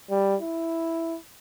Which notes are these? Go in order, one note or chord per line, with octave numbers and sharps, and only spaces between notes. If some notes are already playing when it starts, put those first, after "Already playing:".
G3
E4